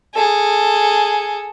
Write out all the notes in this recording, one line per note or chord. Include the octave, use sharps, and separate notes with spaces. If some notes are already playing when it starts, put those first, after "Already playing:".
G#4 A4